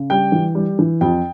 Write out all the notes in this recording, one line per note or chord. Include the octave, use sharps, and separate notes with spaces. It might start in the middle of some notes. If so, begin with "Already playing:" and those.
Already playing: C#3
G3 G5
E3
G3
E3
F2 G5